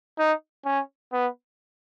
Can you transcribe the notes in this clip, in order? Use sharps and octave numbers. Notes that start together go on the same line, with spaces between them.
D#4
C#4
B3